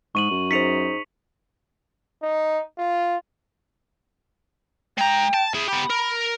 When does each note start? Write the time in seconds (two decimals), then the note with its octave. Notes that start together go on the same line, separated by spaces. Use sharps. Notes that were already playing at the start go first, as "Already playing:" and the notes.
0.15 G#2 C#6 D#7 F#7
0.31 F#2
0.51 D#4 G#4 C5 B6 C#7 F7
2.23 D#4
2.78 F4
4.98 G#3 G5 A#5
5.34 A5
5.54 E4 G#4
5.68 B3 G4 B5
5.90 A#4